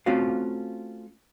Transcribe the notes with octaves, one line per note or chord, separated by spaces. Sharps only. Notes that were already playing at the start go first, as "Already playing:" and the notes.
A3 C4 C#4 F4 F#4 F5